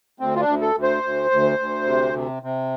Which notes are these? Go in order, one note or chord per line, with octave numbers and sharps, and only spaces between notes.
D2 C4
F4
D4
D2
A4
D2
C5
D2
D2
D2
C3
C3
C3